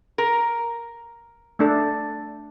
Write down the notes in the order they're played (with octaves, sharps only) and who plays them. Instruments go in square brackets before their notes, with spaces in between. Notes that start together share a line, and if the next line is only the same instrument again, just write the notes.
[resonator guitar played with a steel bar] A#4
[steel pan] A3 D4 A4